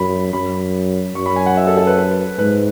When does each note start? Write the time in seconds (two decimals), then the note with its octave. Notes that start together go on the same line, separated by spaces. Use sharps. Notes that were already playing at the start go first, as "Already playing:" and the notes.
Already playing: F#2 B5
0.33 F#2 B5
1.15 F#2 C#6
1.26 B5
1.36 G#5
1.46 F#5
1.57 E5
1.67 A4
1.77 A4
1.87 B4
1.98 B4
2.39 G#2 B4